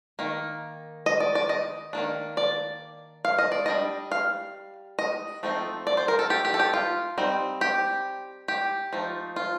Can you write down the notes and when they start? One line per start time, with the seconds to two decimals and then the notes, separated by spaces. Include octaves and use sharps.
0.19 D#3 A#3
1.06 D#5
1.20 D5
1.35 D5
1.49 D#5
1.93 D#3 A#3 D4
2.37 D5
3.25 F5
3.38 D#5
3.52 D5
3.66 G3 D4 D#5
4.12 F5
4.99 D#5
5.43 F3 A3 C4 D#4
5.87 D5
5.97 C5
6.08 A#4
6.19 A4
6.30 G4
6.45 G4
6.54 A4
6.60 G4
6.74 F4
7.18 G3 C4 D#4
7.61 G4
8.48 G4
8.93 F3 A3 D#4
9.36 F4